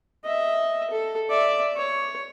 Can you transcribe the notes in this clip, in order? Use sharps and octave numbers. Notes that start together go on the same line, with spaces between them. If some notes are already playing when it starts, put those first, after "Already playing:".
D#5 E5
A4
D5 E5
C#5